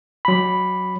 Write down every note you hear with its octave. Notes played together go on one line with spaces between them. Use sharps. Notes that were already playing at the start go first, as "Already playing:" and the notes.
F#3 B5